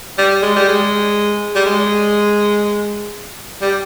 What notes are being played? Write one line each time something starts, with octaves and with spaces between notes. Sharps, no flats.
G3
G#3
G3
G#3
G3
G#3
G3